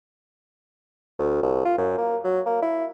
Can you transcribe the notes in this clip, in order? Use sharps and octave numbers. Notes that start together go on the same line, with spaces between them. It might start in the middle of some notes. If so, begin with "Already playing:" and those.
D2
C2
F4
F#2
A#3
F#3
A#3
E4